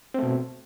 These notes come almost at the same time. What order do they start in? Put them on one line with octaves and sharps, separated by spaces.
C4 A3 B2